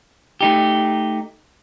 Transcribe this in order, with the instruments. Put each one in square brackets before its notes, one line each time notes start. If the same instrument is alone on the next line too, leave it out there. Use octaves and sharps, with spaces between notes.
[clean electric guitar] A3 D#4 G4